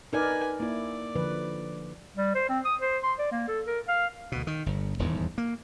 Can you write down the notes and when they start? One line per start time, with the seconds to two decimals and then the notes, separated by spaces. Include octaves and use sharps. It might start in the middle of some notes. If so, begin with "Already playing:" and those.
0.13 D#4 A#4 B4 D5 G#5
0.60 A#3 E4 D5
1.15 D3 F3 B4
2.17 G3
2.35 C5
2.49 C4
2.65 D#6
2.81 C5
3.03 C6
3.19 D5
3.32 A#3
3.48 A4
3.67 A#4
3.88 F5
4.32 D2 B2
4.47 D#3
4.66 G1
4.99 D#1 E2 G#2
5.38 A#3